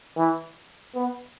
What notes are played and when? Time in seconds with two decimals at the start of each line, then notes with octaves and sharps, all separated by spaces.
0.17 E3
0.95 B3